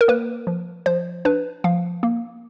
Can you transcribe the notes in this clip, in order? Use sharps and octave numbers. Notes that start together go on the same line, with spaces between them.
A#4
A#3 B4
F3
F3 C5
D4 B4
F3 F5
A#3